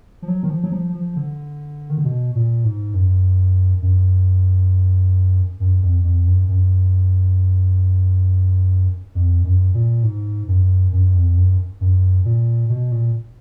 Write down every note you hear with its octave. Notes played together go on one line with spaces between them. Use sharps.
F3
F#3
D#3
F3
F#3
F3
F3
D3
D#3
D3
B2
A#2
G#2
F#2
F#2
F#2
F2
F2
F#2
F#2
F2
F#2
A#2
G#2
F#2
F#2
F2
F#2
F#2
A#2
B2
A#2